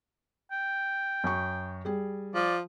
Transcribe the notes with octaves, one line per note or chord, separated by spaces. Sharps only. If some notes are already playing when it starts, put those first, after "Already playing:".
G5
F#2 C#6
G3 G#4
F3 D5